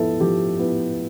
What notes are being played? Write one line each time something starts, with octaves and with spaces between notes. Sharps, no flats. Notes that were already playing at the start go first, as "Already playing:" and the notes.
Already playing: F3 B3 E4 A4 E5
F3 G4
B3 E4